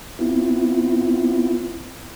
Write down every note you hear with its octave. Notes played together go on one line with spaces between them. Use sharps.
B3 C4 E4 F4